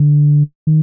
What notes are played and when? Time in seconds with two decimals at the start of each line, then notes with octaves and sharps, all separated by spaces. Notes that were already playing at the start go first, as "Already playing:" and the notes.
Already playing: D3
0.67 D#3